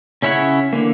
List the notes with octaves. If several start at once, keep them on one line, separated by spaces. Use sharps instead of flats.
C#3 C#4 E4 C#5 F#5
D3 E3 A#3